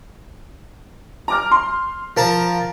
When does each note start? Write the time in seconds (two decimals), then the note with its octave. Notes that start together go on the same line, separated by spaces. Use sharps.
1.28 A#5 D6 F6
1.52 C6
2.17 F3 A#4 A5 A#5